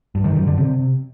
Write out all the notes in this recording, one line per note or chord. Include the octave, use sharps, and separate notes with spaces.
G2
D#3
F#2
D3
C3